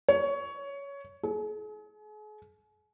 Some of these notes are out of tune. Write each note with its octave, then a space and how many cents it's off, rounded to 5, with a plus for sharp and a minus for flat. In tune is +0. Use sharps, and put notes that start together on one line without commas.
C#5 +15
G#4 +40